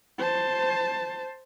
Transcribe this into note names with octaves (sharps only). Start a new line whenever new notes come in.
C5 A5